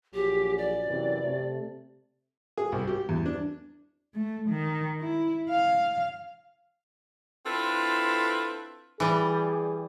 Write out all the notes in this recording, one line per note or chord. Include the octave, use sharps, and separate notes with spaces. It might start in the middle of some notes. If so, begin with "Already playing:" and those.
A#1 F#3 G4 G#4
D5
F#2 C3 E3
C3 A3
G#4
C2
G4
E2
D4
A3
D#3
E4
F5
C4 D4 E4 F4 A4 B4
E3 G3 G#4